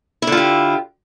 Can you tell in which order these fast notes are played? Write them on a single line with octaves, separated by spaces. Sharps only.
E4 D3 F4 G4